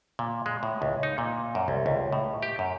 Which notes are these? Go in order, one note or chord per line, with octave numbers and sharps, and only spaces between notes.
A#2
G#3
A2
C#2
D#4
A#2
F#2
C2
C#2
A2
G4
F#2